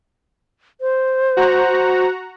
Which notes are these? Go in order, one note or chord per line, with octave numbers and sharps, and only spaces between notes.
C5
F#4 F#5 A#5